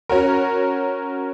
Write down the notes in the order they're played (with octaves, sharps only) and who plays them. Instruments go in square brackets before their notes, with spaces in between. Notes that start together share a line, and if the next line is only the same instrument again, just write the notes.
[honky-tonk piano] C#4 F#4 A#4